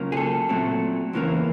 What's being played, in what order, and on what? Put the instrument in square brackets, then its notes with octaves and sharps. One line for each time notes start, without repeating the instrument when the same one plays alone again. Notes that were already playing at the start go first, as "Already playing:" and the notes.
Already playing: [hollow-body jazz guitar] C#2 C#3 F#3 A#3
G#4
A4
A#2 F#3 A3 C4
E2 C#3 E3 G3 A#3